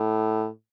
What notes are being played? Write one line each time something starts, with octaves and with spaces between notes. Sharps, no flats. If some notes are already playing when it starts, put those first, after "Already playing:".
Already playing: A2